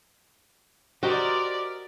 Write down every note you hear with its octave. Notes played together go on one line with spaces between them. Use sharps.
F#4 G4 A#4 C5 D5 D#5